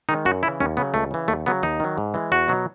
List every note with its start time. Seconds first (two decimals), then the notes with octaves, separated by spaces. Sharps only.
0.09 D#3 G#3 D#4
0.25 F#2 F#4
0.43 C#3 E3 E4
0.60 D#2 C#4
0.77 C#3 F#3 B3
0.94 C#2 A3
1.11 C#3 E3
1.28 D#2 A3
1.46 C#3 F#3 B3
1.63 D#2 D#4
1.80 D#3 F#3
1.98 G#2
2.14 E3 G#3
2.32 E2 F#4
2.48 B2 F#3